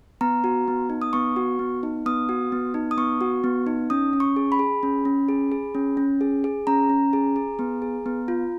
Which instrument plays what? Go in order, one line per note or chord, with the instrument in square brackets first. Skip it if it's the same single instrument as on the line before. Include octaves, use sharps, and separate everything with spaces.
[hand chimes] B3 A#5
F#4
B3
D#4
D#6
B3 C#6
F#4
B3
D#4
B3 D#6
F#4
B3
D#4
D#6
B3 C#6
F#4
B3
D#4
C#4 D#6
C#4
C#6
G#4
B5
G#4
C#4
C#4
G#4
G#4
C#4
C#4
G#4
G#4
C#4 A#5
C#4
G#4
G#4
B3
G#4
B3
F4